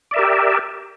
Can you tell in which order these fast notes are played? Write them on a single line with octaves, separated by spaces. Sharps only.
D5 E5 A#4 G4